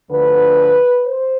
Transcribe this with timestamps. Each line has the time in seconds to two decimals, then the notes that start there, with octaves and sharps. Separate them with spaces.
0.10 D2 D3 F3 B4
1.06 C5